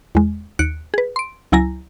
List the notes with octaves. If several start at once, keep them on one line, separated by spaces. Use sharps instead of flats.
E2 G#3
D#2 F#6 C#7 D7
G#4 B4
C6 D7
C#2 F#3 E4 G#5 A#5 A#6